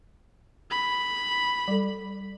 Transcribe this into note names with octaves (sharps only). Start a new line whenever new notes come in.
B5
G3 A4